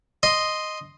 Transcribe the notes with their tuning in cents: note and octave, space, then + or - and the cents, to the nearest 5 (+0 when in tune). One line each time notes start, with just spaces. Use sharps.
D#5 +0 C6 +0